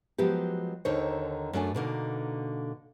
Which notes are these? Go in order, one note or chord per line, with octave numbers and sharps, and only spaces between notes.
F3 F#3 G#3 B3 G4
D#2 D3 D#3 C5 C#5
F#2 A3 D4 G#5
B2 D3 A#3 D#4